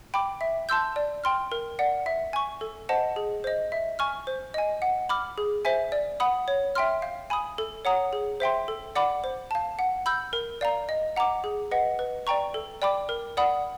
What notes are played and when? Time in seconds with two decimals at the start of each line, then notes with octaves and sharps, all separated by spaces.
0.14 G5 B5 D6
0.41 E5
0.69 A5 C6 E6 G6
0.96 D5
1.24 G5 C6 F6
1.52 A#4
1.79 D5 F#5
2.06 E5
2.33 G#5 C#6
2.61 A4
2.89 C5 D#5 F#5 A5
3.16 G#4
3.44 C5 D#5
3.72 E5
3.99 G#5 C#6 F6
4.27 C5
4.54 D#5 G#5
4.82 F#5
5.09 B5 D6 F6
5.38 G#4
5.65 C5 E5 G#5
5.92 D5
6.20 F#5 B5 D#6
6.48 C#5
6.75 E5 G5 C6 F6
7.02 F5
7.30 G#5 B5 D#6
7.58 A4
7.85 C#5 F#5 A#5 D#6
8.13 G#4
8.40 C5 E5 G5 C6
8.68 A4
8.95 D5 F#5 B5 D6
9.24 C5
9.51 F5 A5
9.79 F#5
10.06 B5 E6 G6
10.33 A#4
10.61 D5 F5 A#5
10.89 D#5
11.16 F#5 A#5 D6
11.44 G#4
11.71 B4 D#5 F#5
11.99 B4
12.27 D5 G5 A#5 C#6
12.54 A4
12.82 D5 G5 B5 D6
13.09 A#4
13.37 D5 F#5 B5 D#6